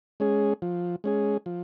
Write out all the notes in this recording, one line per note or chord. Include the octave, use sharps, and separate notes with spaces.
G#3 C#4 G#4
F3
G#3 C#4 G#4
F3